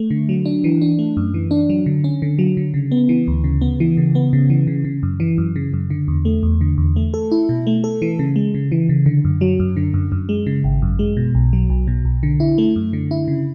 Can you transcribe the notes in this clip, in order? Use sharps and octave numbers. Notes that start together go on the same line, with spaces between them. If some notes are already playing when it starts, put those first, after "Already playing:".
Already playing: A3
D3
F#3
D4
E3
D4
A3
F#2
E3
D4
F#3
D3
C#4
D3
F#3
D3
C#3
B3
E3
D2
C#3
B3
E3
C#3
B3
C#3
E3
C#3
C#3
F#2
E3
F#2
C#3
F#2
D3
E2
A3
E2
D3
E2
A3
A4
E4
B2
A3
A4
E3
C#3
G#3
C#3
E3
C#3
D3
F#2
F#3
F#2
D3
F#2
F#2
G#3
C#3
G#1
F#2
G#3
B2
B1
F#3
B1
B2
B1
D3
E4
A3
F#2
D3
E4
C#3